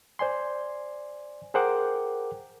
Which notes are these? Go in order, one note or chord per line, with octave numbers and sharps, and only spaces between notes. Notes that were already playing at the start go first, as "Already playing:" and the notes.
C5 D5 G#5 C6
G#4 A#4 C5 F#5 G5 D6